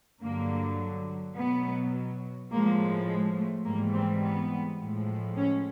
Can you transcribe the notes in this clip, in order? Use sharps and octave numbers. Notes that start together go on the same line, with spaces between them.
G2 D3 F#3 A#3
B2 F#3 B3
A2 F3 G#3 A#3
G#3
A3
G#2 E3 G3 A#3
C4
B3
A2 F3 G#3
C#4